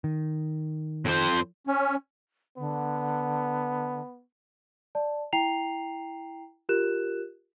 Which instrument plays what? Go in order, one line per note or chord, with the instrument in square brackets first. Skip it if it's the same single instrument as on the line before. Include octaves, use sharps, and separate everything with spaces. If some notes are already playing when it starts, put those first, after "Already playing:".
[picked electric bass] D#3
[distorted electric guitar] F2 C5
[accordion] C#4
[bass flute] D3 [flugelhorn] B3
[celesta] D5 A5
E4 G5 A#5 C7 F7
F4 G4 A#4 F#6 E7